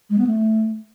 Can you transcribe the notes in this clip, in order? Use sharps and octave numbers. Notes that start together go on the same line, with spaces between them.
G#3
B3
A3